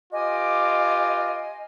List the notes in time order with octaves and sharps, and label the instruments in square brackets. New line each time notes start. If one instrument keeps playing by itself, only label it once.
[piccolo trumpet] F4 [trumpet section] G4 B4 D6 [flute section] D#5 G#5